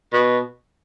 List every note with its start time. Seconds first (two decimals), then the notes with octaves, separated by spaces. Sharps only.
0.13 B2